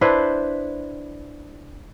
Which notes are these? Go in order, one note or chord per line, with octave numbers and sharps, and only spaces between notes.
D4 E4 B4 C5